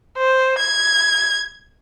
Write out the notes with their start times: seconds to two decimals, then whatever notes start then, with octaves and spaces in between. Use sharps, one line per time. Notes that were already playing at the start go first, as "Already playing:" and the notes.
0.18 C5
0.58 G#6